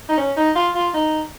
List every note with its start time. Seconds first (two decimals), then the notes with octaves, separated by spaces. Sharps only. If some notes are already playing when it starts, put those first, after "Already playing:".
0.09 D#4
0.17 C#4
0.37 D#4
0.55 F4
0.75 F4
0.94 D#4